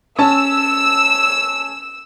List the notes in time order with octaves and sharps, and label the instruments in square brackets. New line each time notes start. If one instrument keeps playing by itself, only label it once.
[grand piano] C#4 A5 [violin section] E6